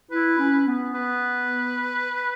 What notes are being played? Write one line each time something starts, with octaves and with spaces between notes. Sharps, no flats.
E4 B4
C#4
B3
B4